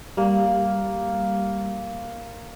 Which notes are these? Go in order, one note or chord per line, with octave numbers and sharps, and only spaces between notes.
G3 A#3